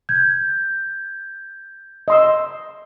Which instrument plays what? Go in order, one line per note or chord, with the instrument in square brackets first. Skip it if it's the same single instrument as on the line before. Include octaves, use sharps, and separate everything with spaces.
[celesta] G6 G#6
[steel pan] D#5 C6 E6